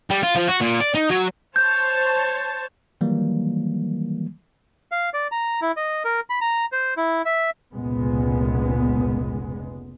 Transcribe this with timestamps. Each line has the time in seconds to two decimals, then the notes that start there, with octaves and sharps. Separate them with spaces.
0.10 G3
0.23 F4
0.35 F3
0.48 F#4
0.61 A#2
0.80 D5
0.94 D#4
1.10 F#3
1.56 C5 C#5 A5 G6
3.01 D#3 E3 F#3 G3 A#3
4.92 F5
5.14 D5
5.32 A#5
5.62 E4
5.77 D#5
6.05 A#4
6.30 B5
6.41 A#5
6.72 C5
6.97 E4
7.25 E5
7.73 F1 C#2 A#2 G#3 B3